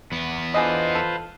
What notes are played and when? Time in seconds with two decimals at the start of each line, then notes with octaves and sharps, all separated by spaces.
0.12 E2 B3
0.54 D3 F4 G#4 B4 C5 D#5
0.95 A4